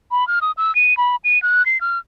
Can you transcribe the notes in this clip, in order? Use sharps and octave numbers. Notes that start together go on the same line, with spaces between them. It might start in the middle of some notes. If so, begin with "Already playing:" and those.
B5
F6
D#6
E6
D#7
B5
D#7
F#6
C7
F6